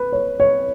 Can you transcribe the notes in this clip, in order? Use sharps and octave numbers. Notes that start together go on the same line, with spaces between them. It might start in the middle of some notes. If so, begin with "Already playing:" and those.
Already playing: B4
C#5
C#5